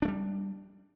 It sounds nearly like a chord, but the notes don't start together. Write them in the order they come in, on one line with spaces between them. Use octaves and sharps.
D4 A3 G3